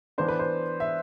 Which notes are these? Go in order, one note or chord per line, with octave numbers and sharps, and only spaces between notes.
E3 B3 D4 C5
B4
C5
E5